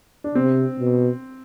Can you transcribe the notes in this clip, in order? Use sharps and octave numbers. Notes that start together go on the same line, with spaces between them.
D4
C3 C4
B2